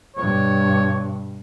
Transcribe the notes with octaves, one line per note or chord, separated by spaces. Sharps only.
G2 B2 C#5